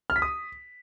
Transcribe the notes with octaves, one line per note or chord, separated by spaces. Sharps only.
F6
B6
D#6